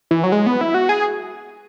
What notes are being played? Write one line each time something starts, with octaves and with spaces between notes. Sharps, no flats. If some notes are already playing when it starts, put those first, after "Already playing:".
E3
F#3
G#3
B3
E4
F#4
G#4